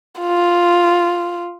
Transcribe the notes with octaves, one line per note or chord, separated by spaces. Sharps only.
F4